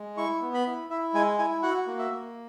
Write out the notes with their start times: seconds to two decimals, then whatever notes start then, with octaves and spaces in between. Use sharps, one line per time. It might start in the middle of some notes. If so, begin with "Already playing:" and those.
Already playing: G#3
0.17 E4 C#6
0.42 B3
0.54 B5
0.67 E4
0.90 E4 E5
1.14 G#3 G#5
1.38 E4 G#5
1.63 F#4 F#5
1.87 A#3
1.99 E5
2.11 A#3